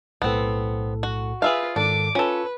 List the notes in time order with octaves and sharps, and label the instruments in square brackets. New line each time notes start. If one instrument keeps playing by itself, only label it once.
[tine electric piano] B1 A2 A4 [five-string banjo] B3 C4
[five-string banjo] F#4
[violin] F4 B4 [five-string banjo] G#4 E5 F5
[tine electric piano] G#2 D#3 A4 [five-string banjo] D4 [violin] D6
[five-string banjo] C#4 A4 [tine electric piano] F4 [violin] B4